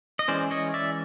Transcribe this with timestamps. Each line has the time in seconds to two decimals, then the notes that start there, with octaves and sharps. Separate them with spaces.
0.19 D#5
0.28 E3 G#3 C#4 C5 D5
0.51 C#5 D#5
0.74 D5 E5